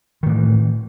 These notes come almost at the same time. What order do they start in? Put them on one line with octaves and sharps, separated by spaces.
D#3 A2 E3